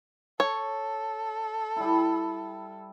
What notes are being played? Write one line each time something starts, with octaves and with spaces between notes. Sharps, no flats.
A4 C#5
G3 E4